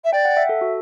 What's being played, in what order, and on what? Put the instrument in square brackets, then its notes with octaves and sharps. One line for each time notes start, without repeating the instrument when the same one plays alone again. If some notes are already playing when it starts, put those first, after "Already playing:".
[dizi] E5
[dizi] D5 [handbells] G5
[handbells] F#5
E5
A4
F#4